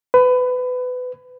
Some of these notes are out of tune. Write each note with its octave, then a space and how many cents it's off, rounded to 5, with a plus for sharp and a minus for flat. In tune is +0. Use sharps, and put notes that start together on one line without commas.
B4 +25